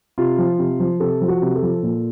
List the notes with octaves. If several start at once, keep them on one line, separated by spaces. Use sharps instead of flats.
C3 F4
F3
C3
F3
C3 A4
F3
F#4
C3
A4
F3
A#2